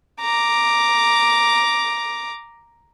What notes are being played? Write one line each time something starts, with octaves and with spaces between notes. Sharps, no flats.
A#5 D6